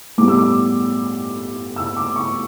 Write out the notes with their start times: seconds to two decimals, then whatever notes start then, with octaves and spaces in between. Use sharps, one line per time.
0.18 A2 G3 B3 D6
0.28 E6
0.39 D6
1.76 E6
1.97 D6
2.16 C#6